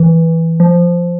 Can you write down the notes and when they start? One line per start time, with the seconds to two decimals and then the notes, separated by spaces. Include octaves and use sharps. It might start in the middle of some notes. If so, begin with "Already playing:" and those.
Already playing: E3
0.60 F3